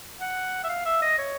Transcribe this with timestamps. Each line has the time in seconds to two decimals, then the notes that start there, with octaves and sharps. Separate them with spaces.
0.20 F#5
0.64 E5
0.69 F5
0.86 E5
1.02 D#5
1.18 C#5